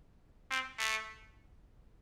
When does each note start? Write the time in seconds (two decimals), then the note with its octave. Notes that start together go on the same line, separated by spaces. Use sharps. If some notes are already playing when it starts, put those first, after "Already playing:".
0.51 C4
0.79 A3